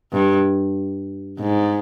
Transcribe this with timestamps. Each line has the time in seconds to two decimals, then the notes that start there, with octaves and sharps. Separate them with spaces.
0.12 G2
1.40 G#2